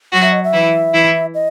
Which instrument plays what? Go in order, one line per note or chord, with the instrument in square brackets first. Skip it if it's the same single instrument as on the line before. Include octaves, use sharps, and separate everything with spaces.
[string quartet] F#3 F#4
[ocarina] E5
D#5
E5
[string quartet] E3 E4
E3 E4
[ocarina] D#5